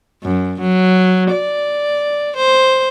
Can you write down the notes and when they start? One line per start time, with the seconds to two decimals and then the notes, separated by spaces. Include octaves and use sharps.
0.23 F#2
0.60 F#3
1.31 D5
2.37 C5